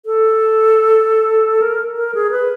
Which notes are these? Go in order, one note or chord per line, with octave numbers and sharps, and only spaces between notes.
A4
A#4
A#4
G#4
B4